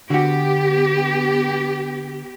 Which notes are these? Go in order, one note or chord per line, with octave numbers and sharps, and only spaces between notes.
D3 B3 F#4 G4